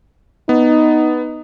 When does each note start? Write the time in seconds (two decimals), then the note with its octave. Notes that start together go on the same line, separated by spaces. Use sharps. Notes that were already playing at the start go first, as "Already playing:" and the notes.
0.49 B3 D#4